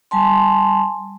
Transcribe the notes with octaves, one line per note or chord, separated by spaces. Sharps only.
G3 G#5 A5 C6